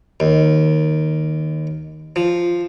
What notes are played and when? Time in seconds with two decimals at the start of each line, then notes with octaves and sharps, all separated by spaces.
0.20 D#2
2.16 F3